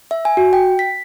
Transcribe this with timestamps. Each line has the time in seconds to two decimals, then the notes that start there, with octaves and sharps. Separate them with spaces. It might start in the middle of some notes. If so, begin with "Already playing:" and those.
0.11 E5
0.25 G#5
0.37 F#4
0.53 G5
0.79 B6